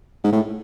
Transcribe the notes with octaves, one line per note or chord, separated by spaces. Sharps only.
G#2
A2